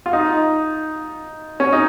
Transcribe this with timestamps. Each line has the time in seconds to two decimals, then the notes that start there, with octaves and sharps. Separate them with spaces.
0.06 F4
0.13 D#4
1.60 C#4
1.73 D#4